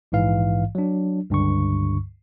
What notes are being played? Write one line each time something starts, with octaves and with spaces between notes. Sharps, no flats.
A#1 G#2 E3 F5
F#3 D4
C#2 G2 D3 C#6